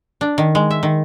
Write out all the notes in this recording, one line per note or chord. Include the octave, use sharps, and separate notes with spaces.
D4
D#3
G#3
E5
D#3